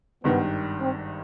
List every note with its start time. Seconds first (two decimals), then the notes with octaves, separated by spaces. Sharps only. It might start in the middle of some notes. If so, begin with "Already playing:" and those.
0.24 G#1 G2 D#3 B3
0.80 C4